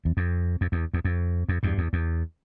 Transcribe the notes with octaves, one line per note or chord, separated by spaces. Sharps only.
E2
F2
F2
E2
E2
F2
F2
E2 G2
E2
E2